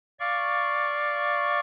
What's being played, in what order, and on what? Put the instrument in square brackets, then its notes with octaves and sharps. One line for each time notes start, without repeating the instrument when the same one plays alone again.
[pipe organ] D5 F5 C#6